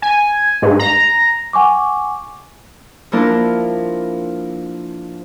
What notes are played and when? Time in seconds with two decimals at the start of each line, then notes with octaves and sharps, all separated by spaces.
0.02 G#5
0.62 G#2
0.79 A#5
1.53 F#5 G#5 C#6 D6
3.12 F3 A#3 D4 E4 A#4